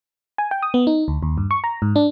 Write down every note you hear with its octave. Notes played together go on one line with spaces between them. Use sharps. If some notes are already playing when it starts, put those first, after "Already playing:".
G#5
G5
D#6
B3
D#4
D2
D#2
G2
C#6
A#5
G#2
D4